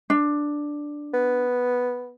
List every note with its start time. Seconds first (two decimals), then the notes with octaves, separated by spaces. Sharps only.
0.10 D4
1.14 B3